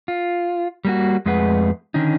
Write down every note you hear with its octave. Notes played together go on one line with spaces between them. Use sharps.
F4
G3 A#3 F#4
F2 G#3 A3 G#4 B4 F#5
D3 D#3 C#4 D#4